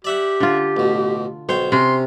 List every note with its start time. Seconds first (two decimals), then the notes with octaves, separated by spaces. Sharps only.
0.04 G4 D5 E5 F#5
0.40 D3 F4
0.77 A1 B2
1.49 B1 C5 C#5 G5
1.72 C3 C#4 C6